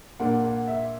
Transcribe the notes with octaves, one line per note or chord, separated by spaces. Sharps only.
A#2 A#3 D4 F#5
F#5
E5